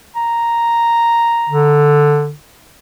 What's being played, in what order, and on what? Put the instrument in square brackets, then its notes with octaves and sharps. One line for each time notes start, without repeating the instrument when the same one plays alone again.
[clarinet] A#5
[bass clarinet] D3